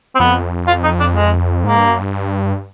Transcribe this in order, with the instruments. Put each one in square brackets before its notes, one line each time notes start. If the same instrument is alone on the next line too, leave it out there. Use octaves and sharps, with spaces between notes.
[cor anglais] C4
[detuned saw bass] F2 [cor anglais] B3
[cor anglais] F4
D#4
D4
G#3
[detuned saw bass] G#2 [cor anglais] A#3
[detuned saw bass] G2
F#2
G2